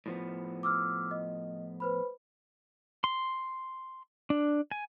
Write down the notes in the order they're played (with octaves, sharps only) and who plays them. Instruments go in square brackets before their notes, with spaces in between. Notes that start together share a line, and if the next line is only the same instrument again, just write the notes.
[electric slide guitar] A2 F3 B3
[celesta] D6 E6 F6
D#5
B4 C5 B5
[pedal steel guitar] C6
D4
G#5